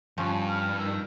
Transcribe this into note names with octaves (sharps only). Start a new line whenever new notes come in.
G2 F3 C#4
F6
D#3 A#5 E6